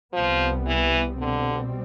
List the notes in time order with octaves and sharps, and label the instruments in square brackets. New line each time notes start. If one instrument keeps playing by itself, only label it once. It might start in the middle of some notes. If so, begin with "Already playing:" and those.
[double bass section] C2 C3 G3 B3 [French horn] F3
[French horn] E3
[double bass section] B2 G3 C4 [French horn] D3